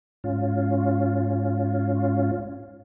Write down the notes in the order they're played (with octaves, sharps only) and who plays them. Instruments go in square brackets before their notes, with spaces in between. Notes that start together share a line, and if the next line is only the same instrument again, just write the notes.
[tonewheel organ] G#2 C#4 F4